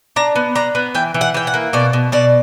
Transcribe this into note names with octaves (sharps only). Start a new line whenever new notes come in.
D4 A#5
B3
D4 A#5
B3
E3 G5
E3
F#5
E3 G5
F#5
A#3
B2 D5
B2
B2 D5